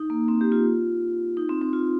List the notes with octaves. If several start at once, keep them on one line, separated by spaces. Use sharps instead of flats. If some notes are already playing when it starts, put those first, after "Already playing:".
Already playing: D#4
A#3
C4
G4
F4
D#4
C4
C4
F4